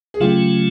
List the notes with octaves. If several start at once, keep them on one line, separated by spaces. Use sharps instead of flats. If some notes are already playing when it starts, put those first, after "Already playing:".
G#4
C#3 F#3 A3 C#4 F4 G4